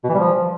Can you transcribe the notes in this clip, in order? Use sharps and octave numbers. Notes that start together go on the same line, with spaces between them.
B2
E3
G3
F3